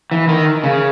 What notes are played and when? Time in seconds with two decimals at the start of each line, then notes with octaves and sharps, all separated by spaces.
0.11 E3
0.29 D#3
0.64 C#3